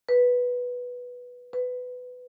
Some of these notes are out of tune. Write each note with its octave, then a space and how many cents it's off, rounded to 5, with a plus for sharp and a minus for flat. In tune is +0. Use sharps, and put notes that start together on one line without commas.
B4 -5
B4 +15